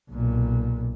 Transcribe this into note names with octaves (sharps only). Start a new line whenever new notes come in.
B1 A#2